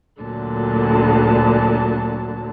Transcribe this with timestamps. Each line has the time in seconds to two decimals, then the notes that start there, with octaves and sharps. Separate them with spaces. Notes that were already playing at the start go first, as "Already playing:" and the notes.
0.20 D2 A#2 D3 F#3 A5